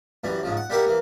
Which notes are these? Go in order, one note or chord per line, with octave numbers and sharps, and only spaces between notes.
F#2 E3 G3
G#2 C#3 F3
F#5
G3 A#3 G4 A#4 E5 F#5
E3 A#3